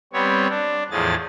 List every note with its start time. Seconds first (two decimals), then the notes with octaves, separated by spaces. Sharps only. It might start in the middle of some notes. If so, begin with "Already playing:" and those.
0.13 G3 B3 C4 C#5
0.50 D4
0.91 E2 A2 F3 G#4 A6